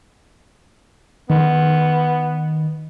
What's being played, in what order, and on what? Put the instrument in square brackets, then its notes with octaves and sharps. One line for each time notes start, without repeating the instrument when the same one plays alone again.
[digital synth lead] D#3 [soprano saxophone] B3